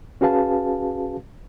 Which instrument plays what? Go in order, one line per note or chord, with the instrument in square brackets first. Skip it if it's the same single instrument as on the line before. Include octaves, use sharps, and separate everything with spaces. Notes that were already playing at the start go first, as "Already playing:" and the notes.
[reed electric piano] C#4 F#4 G#4 B4 F5 A5